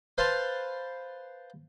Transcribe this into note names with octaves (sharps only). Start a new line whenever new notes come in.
B4 C5 F5 A5 C6